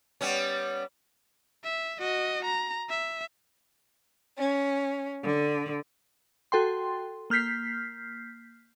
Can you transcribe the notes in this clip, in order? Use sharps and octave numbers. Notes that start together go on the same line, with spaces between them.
G3 B3 C#4
E5
F#4 D#5
A#5
E5
C#4
D3
F#4 A4 G5 C6
A#3 F6 G6 B6 C7